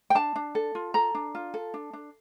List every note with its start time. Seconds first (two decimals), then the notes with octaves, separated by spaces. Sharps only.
0.10 G5
0.15 D4 A5
0.36 D4
0.55 A4
0.75 F4
0.94 A4 A#5
1.15 D4
1.35 F4
1.54 A4
1.74 D4
1.93 D4